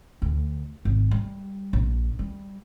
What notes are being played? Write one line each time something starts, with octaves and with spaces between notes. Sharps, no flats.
D2
G#1
G3
A#1
G3